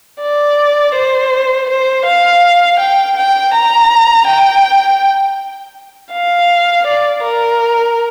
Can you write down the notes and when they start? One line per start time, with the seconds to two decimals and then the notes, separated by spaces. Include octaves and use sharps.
0.21 D5
0.95 C5
1.69 C5
2.05 F5
2.79 G5
3.17 G5
3.54 A#5
4.27 G5
6.13 F5
6.86 D5
7.23 A#4